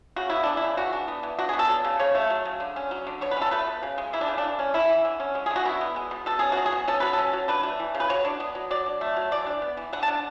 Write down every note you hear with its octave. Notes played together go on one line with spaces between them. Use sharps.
C#3 F#4
B3 E4
E3 D4
E4
C#3
E3 F#4
D4
B3
E3
D4 F#4
G#4
B3
A4
F#3
C#3
C#3 C#5
A3
F#3
C#3
D3
C#4
F#3
D3
B2 C#5
B4
C#4 A4
A3 B4
B2
C#3
G#3
E3 E4
D4
C#3
D4
E3
C#4
A3 E4
E3
D3
C#4
G#3
G#4
D3
F#4
B2 E4
B3
G#3
B2
B2 A4
C#4 G#4
F#3 F#4
G#4
B2
C#4 A4
F#3 B4
C#4 A4
F#3
D4 B4
A3
E3
C#3
B4
F#3 C#5
D4
B3
F#3
F#3 D5
D4
A3
F#3
E3 D5
D4
B3
E3
D3 F#5
A5
D4